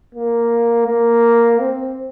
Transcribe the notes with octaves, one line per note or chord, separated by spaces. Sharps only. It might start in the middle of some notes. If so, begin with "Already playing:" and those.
A#3
A#3
C4